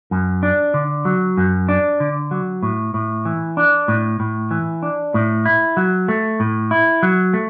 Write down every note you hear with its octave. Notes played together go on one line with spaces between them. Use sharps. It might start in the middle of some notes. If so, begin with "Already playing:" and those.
F#2
D4
D3
F#3
F#2
D4
D3
F#3
A2
A2
E3
D4
A2
A2
E3
D4
A2
E4
F#3
A3
A2
E4
F#3
A3